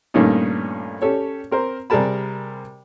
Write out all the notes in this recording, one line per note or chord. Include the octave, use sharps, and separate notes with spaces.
G2 A#2 D#3 A3 C#4 D#4
C#4 G4 A4 C#5
C4 A#4 C5
C3 G3 G#4 A#4 A5 B5